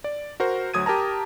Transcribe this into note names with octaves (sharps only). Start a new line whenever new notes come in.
D5
F#4 A#4 C5
D2 F#3 D#6 G#6 D#7
G4 A#4 A5 A#5